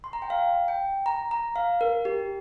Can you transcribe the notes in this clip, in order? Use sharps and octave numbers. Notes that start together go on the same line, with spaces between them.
C6
A#5
G5
F5
G5
A#5
A#5
F5
A#4
G4